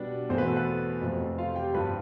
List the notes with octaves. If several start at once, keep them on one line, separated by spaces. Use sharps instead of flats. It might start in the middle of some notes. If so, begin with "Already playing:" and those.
Already playing: B2 G3 B3 D4 D5
E2 B2 A3 C4 C5
B4
A4
B4
F2 C3 F3 A3
F4 F5
G4 G5
G2 F3 B3 B4 B5